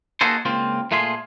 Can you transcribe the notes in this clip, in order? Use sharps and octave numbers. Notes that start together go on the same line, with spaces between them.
A#3 D#4 F#4 G#4 A4 C5
C#2 A#3 C4 F4
A#2 A3 F4 G#4 C6